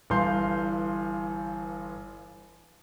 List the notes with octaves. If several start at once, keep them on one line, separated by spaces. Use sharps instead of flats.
G1 G2 E3 F5 C6 G6